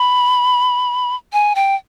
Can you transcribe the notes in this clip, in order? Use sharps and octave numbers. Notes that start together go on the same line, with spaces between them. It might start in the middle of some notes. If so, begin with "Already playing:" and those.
Already playing: B5
G#5
G5